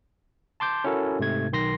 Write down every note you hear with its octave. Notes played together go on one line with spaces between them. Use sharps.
A5 C6 D6 G6
C#4 E4 F#4 A4 A#4
G#2 C3 A3 G#6
B1 D#3 C6 A#6 C7